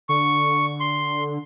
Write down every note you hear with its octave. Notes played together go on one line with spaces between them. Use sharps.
D3 C#6
C6